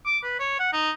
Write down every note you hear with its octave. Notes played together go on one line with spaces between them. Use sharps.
D6
B4
C#5
F#5
D#4